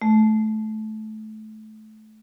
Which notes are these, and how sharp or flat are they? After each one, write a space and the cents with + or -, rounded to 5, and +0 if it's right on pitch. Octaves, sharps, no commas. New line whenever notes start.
A3 -20